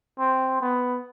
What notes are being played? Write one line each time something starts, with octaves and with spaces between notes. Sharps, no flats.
C4
B3